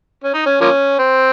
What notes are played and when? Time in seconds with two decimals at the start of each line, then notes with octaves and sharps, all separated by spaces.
0.23 C#4
0.34 D#4
0.46 C#4
0.61 F3 A#3 C#4
0.99 C4